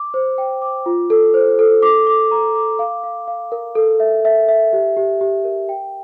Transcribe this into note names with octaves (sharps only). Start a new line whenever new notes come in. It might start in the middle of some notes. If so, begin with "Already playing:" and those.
Already playing: D6
C5
G5
D6
F4
A4
C5
A4
D6
D6
A#5
D6
F5
F5
F5
A#4
A4
E5
E5
E5
G4
G4
G4
A#4
G5